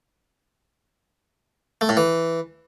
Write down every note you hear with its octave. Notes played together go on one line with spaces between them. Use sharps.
A3
A2
E3